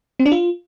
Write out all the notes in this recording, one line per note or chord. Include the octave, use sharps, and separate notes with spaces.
C4
D4
F4